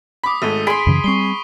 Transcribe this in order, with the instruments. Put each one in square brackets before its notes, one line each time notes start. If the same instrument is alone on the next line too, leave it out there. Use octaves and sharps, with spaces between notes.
[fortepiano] B5 D6 [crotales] D#6 B6
[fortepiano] G#1 G#2 A3 [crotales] B6 D#7 G7
[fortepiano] G#4 [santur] B5 C6 [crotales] D7
[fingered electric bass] F#2 C#3 E3
[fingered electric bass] G3 C4 [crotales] C#6 C7 G7